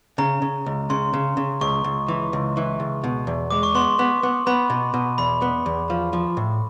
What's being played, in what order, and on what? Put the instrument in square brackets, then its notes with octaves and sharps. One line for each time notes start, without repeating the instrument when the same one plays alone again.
[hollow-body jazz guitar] C#3 [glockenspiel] A#5
[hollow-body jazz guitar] C#3
C#2
[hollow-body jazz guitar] C#3 [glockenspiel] C6
[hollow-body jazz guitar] C#3
C#3
[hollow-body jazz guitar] C#2 [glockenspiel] C#6
[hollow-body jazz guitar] C#2
E3
C#2
E3
C#2
B2
E2
[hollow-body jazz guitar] G#3 [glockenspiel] D6
[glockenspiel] C#6
[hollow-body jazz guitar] B3 [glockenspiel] C6
[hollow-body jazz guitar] B3
B3
[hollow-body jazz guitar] B3 [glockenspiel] B5
[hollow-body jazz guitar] B2
B2
[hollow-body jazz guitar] E2 [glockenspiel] B5
[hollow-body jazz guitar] B3
E2
F3
F3
A2